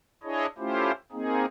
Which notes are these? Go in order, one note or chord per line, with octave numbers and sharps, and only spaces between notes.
D4 E4 G#4 C#5 D#5
A3 C#4 E4 F4 G4 C5
A#3 C4 D#4 G#4